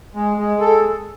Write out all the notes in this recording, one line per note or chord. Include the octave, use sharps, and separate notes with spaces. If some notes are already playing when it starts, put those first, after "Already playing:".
G#3
G#3
A4